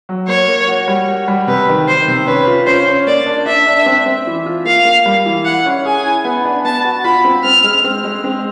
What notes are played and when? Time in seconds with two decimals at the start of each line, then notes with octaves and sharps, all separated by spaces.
0.09 F#3
0.28 A#3 C#5
0.48 A#3
0.68 F#4
0.88 G3
1.08 F#4
1.28 G3
1.47 C3 B4
1.68 D#3
1.88 D#3 C5
2.08 C3
2.27 C#4 B4
2.47 F4
2.66 C#4 C5
2.87 C#4
3.07 A#3 D5
3.26 D4
3.46 D4 E5
3.67 D4
3.86 C4
4.06 C4
4.27 E3
4.46 F4
4.65 A#3 F5
4.85 A#3
5.06 G3
5.25 E3
5.45 E4 F#5
5.66 C#4
5.85 G#4 G#5
6.06 E4
6.25 B3
6.45 D4
6.65 B3 A5
6.84 F#4
7.04 F4 B5
7.25 C4
7.44 C4 F6
7.64 G#3
7.84 C4
8.04 G#3
8.24 C4